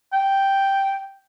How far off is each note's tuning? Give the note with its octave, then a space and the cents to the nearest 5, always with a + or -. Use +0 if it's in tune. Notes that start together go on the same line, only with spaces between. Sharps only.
G5 -5